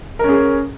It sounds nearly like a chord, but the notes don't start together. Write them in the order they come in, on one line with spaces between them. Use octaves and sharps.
A#4 C#4 G#4